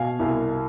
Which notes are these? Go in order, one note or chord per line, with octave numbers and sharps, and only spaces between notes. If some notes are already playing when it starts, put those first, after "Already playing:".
Already playing: B2 F5 G#5
C2